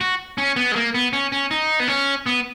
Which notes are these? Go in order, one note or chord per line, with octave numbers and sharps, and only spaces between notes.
F#4
C#4
B3
G#3
A#3
B3
C#4
C#4
D#4
B3
C#4
B3